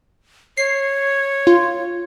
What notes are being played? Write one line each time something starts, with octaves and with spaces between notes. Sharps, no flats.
C#5 C7
F4